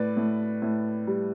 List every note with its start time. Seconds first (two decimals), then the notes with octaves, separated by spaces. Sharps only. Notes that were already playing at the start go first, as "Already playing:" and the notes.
Already playing: A2 B4 D5
0.17 A2
0.62 A2
1.07 G3